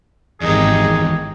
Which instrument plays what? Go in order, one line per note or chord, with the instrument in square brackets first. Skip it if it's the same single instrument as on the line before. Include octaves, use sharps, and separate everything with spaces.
[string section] G#1 [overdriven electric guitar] E2 D#3 [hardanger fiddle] D#4 G4 [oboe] G#4